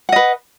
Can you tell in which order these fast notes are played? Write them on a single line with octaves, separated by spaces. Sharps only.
F#5 D#5 B4